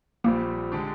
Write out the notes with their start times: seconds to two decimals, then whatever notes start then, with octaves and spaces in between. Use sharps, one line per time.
0.24 A#1 A#2 G3 A#3 C4 G4
0.72 D3 G#3 D4 G4